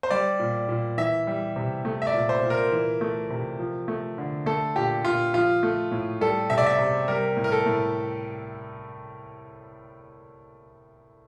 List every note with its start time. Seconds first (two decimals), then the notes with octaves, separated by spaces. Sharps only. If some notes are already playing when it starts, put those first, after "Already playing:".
0.03 C5
0.10 G3 D5
0.39 A#2
0.69 A#2
0.98 E3 E5
1.27 G3
1.56 C3
1.85 A3
2.02 E5
2.07 D5
2.14 A#2
2.29 C5
2.43 A#2
2.50 A#4
2.72 E3
3.01 A3
3.30 C3
3.59 F3
3.88 A3
4.18 D3
4.46 A3 A4
4.75 A#2 G4
5.05 A#2 F4
5.34 F3 F4
5.63 A3
5.91 A2
6.21 G3 A4
6.50 C3 E5
6.58 D5
6.66 E5
6.78 C3
7.08 G3 A#4
7.37 A2
7.44 A#4
7.52 A4
7.66 A2